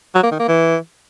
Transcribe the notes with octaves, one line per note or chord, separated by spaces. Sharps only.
F#3
A#3
D#3
A#3
E3